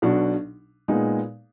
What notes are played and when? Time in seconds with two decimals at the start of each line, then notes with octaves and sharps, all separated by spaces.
0.02 B1 B2 F#3 D4 F#4
0.88 A#2 G#3 B3 D#4